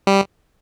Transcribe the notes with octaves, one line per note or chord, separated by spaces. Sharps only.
G3